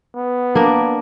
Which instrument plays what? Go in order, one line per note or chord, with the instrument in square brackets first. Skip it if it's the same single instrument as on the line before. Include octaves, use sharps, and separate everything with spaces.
[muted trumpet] B3
[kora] A#3 D4 A#4